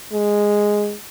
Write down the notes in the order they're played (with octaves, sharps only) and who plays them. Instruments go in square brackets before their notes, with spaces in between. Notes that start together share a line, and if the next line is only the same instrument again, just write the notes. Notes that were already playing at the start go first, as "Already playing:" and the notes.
[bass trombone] G#3